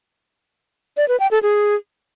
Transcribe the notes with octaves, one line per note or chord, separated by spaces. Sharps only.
D5
B4
G5
A4
G#4